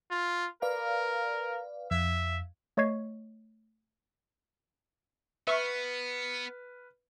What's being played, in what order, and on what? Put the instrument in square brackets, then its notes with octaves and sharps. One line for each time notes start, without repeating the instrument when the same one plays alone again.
[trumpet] F4
[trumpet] A#4 [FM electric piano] B4 D5 F5
[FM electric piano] F2 [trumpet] E5
[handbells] A3 C#5 D#5 C#6 G#6 C7
[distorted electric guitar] B3 [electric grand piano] B4 F6 [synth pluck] E5 C#6